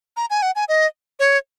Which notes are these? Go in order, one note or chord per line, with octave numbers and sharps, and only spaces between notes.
A#5
G#5
F#5
G#5
D#5
C#5